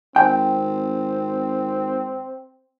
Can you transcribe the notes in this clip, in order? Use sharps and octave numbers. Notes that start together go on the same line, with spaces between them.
G#1 C4 G5